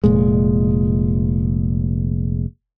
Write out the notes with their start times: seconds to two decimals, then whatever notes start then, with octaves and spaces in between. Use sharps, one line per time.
0.04 F1 A#2 G#3